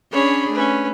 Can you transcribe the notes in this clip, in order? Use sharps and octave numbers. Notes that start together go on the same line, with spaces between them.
C#4 D4 G#4 C#5 B5
A3 C#4 B4